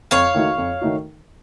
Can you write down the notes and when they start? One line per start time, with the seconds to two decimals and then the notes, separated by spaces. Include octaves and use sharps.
0.11 F2 C#5 F5
0.34 D#3 A3 D#4 F#4
0.58 F2
0.81 D#3 A3 D#4 F#4